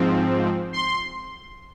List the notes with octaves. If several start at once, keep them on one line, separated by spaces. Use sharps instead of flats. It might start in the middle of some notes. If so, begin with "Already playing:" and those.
Already playing: G#2 F3 C4
C6